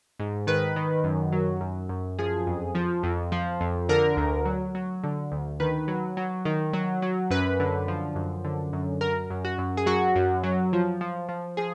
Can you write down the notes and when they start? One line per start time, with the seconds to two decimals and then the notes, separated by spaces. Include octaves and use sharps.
0.19 G#2
0.47 D#3 B4
0.76 D#3
1.04 F#2
1.32 F#3
1.61 F#2
1.89 F#2
2.19 F3 G#4
2.47 F2
2.75 F3
3.03 F2
3.32 F3
3.61 F2
3.89 D3 A#4
4.17 D2
4.45 F#3
4.75 F#3
5.04 D3
5.32 D2
5.60 D#3 B4
5.88 F#3
6.17 F#3
6.45 D#3
6.73 F#3
7.02 F#3
7.30 F#2 B4
7.60 D3
7.88 F3
8.16 F#2
8.45 D3
8.73 F#2
9.01 F#2 A#4
9.30 F#2
9.45 F#4
9.58 F#2
9.77 G#4
9.86 F#3 F#4
10.16 F#2
10.43 F#3
10.73 F3
11.01 F3
11.29 F3
11.57 F3 G#4